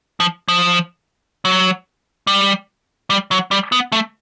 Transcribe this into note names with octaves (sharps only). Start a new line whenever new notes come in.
F3
F3
F#3
G3
G3
F#3
G3
B3
A3